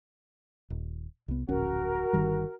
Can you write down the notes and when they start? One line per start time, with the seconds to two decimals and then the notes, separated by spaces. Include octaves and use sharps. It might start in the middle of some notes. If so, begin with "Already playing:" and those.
0.70 D#1
1.28 C2 B3
1.49 D1 A#1 C#4 F#4 A#4
2.13 G1 D#3 G3